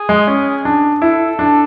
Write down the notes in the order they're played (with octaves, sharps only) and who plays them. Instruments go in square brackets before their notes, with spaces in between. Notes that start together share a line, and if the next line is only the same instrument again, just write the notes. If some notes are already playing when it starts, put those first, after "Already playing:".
Already playing: [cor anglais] G#4
[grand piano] G#3
C#4
D4
[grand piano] E4 [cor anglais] A4
[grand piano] D4